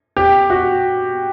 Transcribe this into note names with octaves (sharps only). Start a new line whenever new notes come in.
G4
F#4